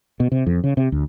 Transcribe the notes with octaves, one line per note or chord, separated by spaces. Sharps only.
B2
C3
F2
C#3
C3
D2